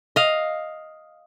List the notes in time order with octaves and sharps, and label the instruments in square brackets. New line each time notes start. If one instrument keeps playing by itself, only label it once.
[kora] D#5 F5